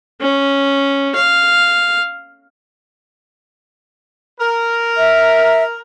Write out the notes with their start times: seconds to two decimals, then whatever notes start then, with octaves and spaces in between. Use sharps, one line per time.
0.21 C#4
1.15 F5
4.40 A#4
4.98 E5